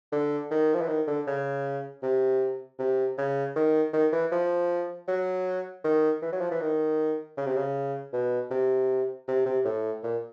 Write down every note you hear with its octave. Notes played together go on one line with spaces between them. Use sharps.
D3
D#3
F3
E3
D#3
D3
C#3
C3
C3
C#3
D#3
D#3
E3
F3
F#3
D#3
E3
F#3
F3
E3
D#3
C#3
C3
C#3
B2
C3
C3
C3
A2
A#2